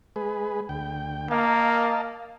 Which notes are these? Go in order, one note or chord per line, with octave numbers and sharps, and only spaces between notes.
G#3 G#4 B4
D2 G5
A#3 D#5 F5 A5